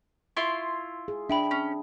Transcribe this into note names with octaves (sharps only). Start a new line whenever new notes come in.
E4 F4 C6 C#6 G7
G#4
D4 E5 G5 B5
C#4